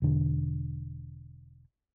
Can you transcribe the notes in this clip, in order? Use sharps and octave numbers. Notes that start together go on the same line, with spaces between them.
E1 D3